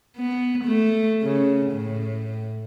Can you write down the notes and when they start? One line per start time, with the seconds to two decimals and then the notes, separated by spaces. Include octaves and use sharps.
0.17 B3
0.64 A3
1.22 C#3
1.71 A2